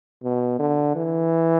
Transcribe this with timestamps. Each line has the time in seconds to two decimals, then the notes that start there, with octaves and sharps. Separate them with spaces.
0.24 B2
0.60 D3
0.95 E3